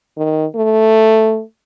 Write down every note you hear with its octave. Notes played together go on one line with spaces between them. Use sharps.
D#3
A3